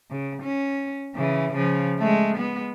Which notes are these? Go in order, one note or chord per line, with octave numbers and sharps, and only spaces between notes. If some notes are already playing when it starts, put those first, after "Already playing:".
C#3
C#4
C#3 E3
C#3 F3
G#3 A3
G#3 B3